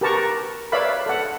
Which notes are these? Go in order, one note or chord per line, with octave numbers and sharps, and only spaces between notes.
G4 A#4 B4 A5 A#5 C#6
B4 C#5 D5 E5 F5 B5
A4 F#5